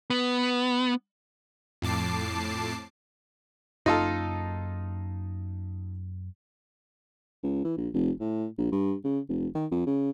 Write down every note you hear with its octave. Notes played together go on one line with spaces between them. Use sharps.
B3
F2 A2 A5 D6 C7
F#2 A#3 C#4 D#4 F4 A4
C#2
E3
A#1
F1
A2
A#1
G2
C#3
F1
D#3
F2
C#3